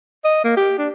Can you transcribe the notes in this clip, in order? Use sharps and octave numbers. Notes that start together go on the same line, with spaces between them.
D#5
A#3
G4
D4